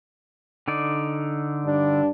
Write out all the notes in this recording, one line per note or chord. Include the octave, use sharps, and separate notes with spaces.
D3 D#4 D5
G2 D4